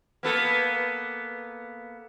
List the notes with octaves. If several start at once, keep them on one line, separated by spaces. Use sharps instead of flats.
A#3 B3 A4